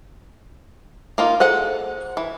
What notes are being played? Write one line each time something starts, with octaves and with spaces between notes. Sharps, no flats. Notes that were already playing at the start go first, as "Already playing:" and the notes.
A#3 D#4 F4
G#4 A4 C5 F#5
E3